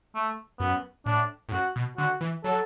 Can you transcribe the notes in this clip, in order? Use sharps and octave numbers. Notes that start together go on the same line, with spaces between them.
A3
F#2 B3
A2 D4
A2
F#2 F#4
B2
D3 F#4
E3
F#3 A4